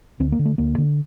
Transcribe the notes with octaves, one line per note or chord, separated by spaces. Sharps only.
D2 C4
A#3
D3
A3
D2 A#3
D3